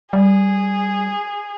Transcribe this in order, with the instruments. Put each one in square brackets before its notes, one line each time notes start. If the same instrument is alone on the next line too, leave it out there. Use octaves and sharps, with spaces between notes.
[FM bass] G3 [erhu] G#4